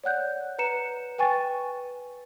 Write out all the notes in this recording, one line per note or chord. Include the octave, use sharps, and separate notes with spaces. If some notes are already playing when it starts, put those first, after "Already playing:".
C#5 D5 F#5 F#6 G6
B4 A#5 C#7 E7
B4 G5 G#5 C#6 A6